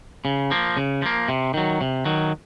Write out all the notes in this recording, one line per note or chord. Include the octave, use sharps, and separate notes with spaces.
C#3
F3 A#3
C#3
F3 A#3
C3
D#3 F#3
C3
D#3 F#3